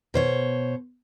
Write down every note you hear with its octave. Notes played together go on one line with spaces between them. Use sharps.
B2 C5 C#5